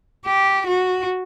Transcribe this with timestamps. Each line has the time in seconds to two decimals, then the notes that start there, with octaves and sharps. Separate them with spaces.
0.26 G4
0.67 F#4